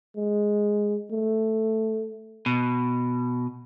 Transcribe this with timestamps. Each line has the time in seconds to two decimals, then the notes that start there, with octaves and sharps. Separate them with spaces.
0.16 G#3
1.11 A3
2.46 B2